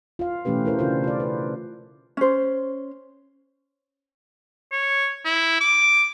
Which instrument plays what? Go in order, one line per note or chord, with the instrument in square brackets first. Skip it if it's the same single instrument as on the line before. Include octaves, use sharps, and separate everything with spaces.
[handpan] F4 F5
B2 E3 A3 C#4 G4 B4
E4 A#4 C5
C#3 D4 F4 C5
F4 D5
B4
[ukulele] C#4 C5
[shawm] C#5
E4
D6